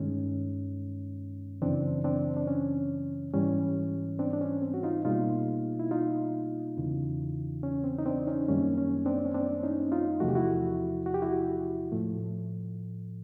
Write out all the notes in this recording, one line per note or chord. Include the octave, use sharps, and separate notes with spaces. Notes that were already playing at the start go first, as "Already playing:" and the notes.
Already playing: G2 D#3 G#3 C#4
F#2 C#3 E3 C4 D4
C4 D4
D4
C#4
G#2 E3 G3 C#4
C4 D4
D4
C#4
C4
F#4
D#4 F4
B2 G3 A#3 D#4 F4
E4
D#4 F4
E2 C#3 E3
C#4
C4
D#4
C4 D4
C#4 D#4
F#2 D#3 G3 A#3 C#4
C#4
C4 D4
C#4
C4 D4
C#4 D#4
D#4 F4
E2 C3 F3 A3 F#4
G4
E4 F#4
F#4
G4
E4 F#4
A2 F3 A3